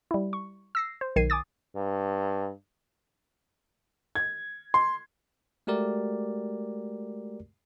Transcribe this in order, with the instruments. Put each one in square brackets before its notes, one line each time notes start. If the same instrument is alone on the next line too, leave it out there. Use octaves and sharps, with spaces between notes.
[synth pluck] G3 E4
C#6
E6 A#6 C7
C5
B1 D#3 G#6 C7 D#7
G#5 D6 D#6 A6
[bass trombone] G2
[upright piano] G#6
C6
[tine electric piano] G#3 A3 F#4 G4 A#4 D5